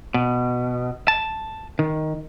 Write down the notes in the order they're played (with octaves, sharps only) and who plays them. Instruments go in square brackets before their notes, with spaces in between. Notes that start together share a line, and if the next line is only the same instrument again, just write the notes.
[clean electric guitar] B2
A5
D#3